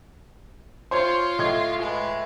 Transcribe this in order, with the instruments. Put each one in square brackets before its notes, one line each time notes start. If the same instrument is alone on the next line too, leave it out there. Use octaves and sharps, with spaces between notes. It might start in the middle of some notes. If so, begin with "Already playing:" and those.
[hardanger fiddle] F4 [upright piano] C5 C#5
[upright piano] A2 D#5 G#6
[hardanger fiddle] G#3 B4